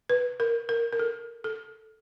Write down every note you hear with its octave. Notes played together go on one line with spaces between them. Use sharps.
B4
A#4
A#4
A#4
A4
A4